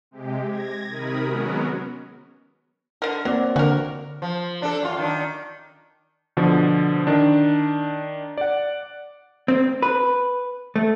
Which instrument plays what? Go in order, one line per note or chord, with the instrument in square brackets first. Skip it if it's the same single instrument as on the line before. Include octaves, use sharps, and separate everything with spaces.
[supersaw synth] C3 G#3 G4
G#6 A#6
C3 D#3 A#4 B5 D#6
F#3 G#3 B3 C#4 F#4 A#4
[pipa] D3 A#4
[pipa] F#3 [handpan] A#3 C4 D5
[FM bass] D3 [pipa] F#4 A#4
[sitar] F3
D4 A4
F#2 F4
D#3 D4
[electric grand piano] B2 D3 F3
D#3 D4
D5 F#5
[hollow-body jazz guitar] C4
B4
A3